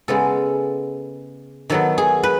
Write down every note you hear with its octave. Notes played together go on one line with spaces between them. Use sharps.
C#3 G#3 B3 A4
D#3 F#3 B3 A4
G#4
B4